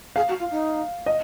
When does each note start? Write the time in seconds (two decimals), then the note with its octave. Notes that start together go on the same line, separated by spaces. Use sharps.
0.16 G#4 F5
0.28 F#4
0.39 F4
0.50 D#4
1.06 D#5